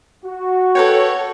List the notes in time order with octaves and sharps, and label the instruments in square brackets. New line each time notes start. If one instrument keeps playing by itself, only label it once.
[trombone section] F#4
[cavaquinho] A4 B4 G5 [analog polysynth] C#5